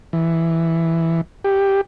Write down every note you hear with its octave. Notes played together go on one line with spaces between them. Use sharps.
E3
G4